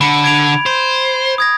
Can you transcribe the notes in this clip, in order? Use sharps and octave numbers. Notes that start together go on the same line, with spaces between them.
D3 B5 D7
G#6 D7 F7
C5
D#6 G#6 A#6